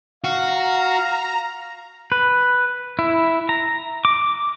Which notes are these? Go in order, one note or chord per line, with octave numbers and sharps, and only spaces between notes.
F#4 F5 A#5
B4
E4
A#5
D6